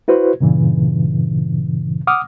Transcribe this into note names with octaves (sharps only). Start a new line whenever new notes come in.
E4 F#4 B4 C5
G2 A#2 C#3 E3
F#5 D6 D#6 F6